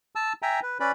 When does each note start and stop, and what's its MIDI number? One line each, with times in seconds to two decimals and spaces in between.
0.15 0.33 81
0.15 0.33 88
0.42 0.60 76
0.42 0.60 79
0.42 0.60 80
0.42 0.60 82
0.62 0.78 71
0.80 0.92 61
0.80 0.92 71
0.80 0.92 74
0.80 0.92 83